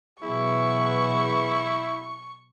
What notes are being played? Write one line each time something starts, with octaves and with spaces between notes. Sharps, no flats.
B2 E3 F#3 B3 E4 G#4 C#6